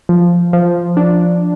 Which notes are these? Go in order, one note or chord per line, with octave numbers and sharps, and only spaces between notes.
F3
F3
D4